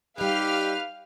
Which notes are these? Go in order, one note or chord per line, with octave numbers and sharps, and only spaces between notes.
G3 D#4 G4 B4 F5 F6